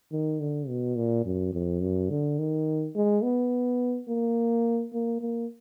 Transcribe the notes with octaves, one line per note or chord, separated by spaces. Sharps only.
D#3
D3
B2
A#2
F#2
F2
F#2
D3
D#3
G#3
B3
A#3
A#3
A#3